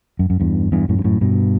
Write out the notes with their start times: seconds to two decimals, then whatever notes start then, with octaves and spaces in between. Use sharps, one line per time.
0.19 F#2
0.30 F#2
0.40 E2 G2
0.72 E2 G2
0.89 F#2 A2
0.98 G2
1.04 F#2 A2
1.21 G2 B2